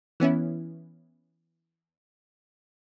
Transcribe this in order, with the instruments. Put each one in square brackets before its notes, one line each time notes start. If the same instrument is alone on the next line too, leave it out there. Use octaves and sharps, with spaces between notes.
[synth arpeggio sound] E3 B3 C#4 E4